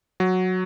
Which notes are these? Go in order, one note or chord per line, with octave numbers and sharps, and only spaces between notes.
F#3